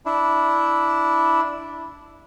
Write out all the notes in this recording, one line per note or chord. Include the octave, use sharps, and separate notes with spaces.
D4 E4